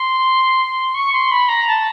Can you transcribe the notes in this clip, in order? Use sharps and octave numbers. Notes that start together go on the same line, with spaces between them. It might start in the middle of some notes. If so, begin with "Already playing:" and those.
Already playing: C6
C#6
C6
B5
A#5
A5